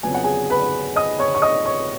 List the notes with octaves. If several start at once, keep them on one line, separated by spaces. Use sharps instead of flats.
F2 C#3 F#3 B3 G#5
F#5
G#4 G#5
B4 B5
D#5 D#6
C#5 C#6
C#6
D#5 D#6
C#5 C#6